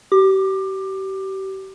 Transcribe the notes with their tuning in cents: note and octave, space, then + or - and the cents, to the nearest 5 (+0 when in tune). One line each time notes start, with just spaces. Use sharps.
G4 -35 D6 +20